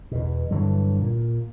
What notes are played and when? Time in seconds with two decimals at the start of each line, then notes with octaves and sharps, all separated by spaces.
0.12 E2 B2
0.51 G2 D3 E3 F#3
1.00 A#2